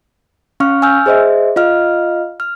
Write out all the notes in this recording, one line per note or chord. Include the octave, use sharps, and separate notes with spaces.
C#4 F5 C#6 F6
G#5 E6 F6 G6
G#4 C5 D#5 E5
F4 D#5 F5 F6
F6